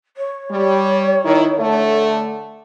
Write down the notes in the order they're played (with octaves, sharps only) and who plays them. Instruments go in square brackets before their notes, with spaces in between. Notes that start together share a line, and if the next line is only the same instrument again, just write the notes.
[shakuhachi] C#5
[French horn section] G3
D#3 E4
D3 A3